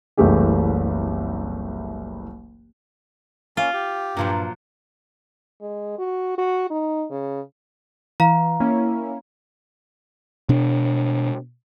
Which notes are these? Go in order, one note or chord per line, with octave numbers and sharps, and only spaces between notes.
F#1 C2 E3 A3 G4 G#4
A#3 C#4 F4
G4
G2 A#2 F3 F#3
G#3
F#4
F#4
D#4
C#3
E3 F5 A#5
A#3 C#4 E4
B2 D4